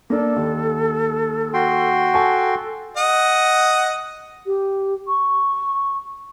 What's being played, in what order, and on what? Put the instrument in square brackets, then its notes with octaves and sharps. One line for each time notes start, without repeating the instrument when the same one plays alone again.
[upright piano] A#3 D4 [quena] A4
[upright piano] D#2
[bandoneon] F#4 G5 C6
[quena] A4 [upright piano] G#5 A5 C#6
[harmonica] D#5 F#5 D#6
[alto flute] G4
C#6